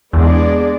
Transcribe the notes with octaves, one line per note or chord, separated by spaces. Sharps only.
E2 G#3 B3 D4 G#4 D5